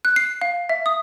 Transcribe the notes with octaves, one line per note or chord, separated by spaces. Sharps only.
F#6
C7
F5
E5
D#6